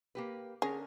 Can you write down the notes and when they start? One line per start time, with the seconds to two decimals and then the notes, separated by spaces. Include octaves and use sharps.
0.15 A#3 G4 B4
0.62 D3 C#4 G#4 A#4